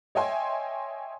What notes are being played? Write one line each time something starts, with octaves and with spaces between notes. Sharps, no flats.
C#5 D#5 E5 G5 G#5 C6